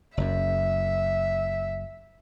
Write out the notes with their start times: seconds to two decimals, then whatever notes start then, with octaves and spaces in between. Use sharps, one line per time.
0.17 F#1 F#2 E5